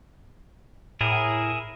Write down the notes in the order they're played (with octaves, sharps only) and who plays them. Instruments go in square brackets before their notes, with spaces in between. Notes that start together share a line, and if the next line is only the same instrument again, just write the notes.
[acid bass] A2 [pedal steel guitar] E4 G#4 A#4